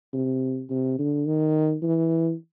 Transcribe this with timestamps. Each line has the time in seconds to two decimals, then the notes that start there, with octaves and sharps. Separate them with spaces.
0.13 C3
0.70 C3
0.99 D3
1.26 D#3
1.82 E3